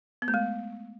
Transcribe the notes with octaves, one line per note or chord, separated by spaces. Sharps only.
B3
A3
G#3